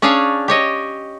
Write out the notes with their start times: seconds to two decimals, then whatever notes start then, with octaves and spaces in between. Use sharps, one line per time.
0.02 C#4 D4 G#4 C#5 F5
0.48 G4 C#5 D#5